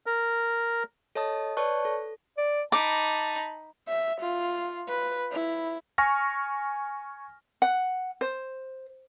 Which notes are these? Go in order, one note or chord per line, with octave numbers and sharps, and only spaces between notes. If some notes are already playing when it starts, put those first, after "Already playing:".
A#4
A4 C#5 D#5 A5 D#6
B4 C#5 D5 A5 C#6 F#6
A4
D5
D#4 A5 B5 D6
E5
F4
B4
E4
G#5 C#6 F6 A#6
F#5
C5